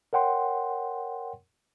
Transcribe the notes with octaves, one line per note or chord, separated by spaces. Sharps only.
A#4 C#5 F#5 G5 C6